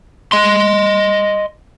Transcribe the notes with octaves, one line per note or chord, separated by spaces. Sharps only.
D#5 C6